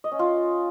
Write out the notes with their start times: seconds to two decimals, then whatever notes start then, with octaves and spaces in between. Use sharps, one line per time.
0.04 D#5
0.12 C#4
0.19 F4